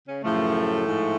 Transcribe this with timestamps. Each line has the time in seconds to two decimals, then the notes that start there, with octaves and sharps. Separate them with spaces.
0.08 C#3 C#4
0.23 F#2 A2 C#3 F3 A3
0.86 G#2 F3